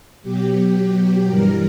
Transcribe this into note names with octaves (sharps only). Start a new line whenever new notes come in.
B2 F#3 G4
G4
G2 E3 G3 A#4